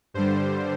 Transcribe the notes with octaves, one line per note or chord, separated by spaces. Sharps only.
G2 D3 G3 C5